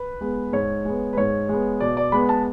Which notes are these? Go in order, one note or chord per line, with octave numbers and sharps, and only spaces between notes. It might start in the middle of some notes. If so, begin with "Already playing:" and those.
Already playing: B4
G#3 B3
G#2 C#5
G#3 B3
B4
G#2 C#5
G#3 B3
B2 D5
D5
G#3 B3 B5
A5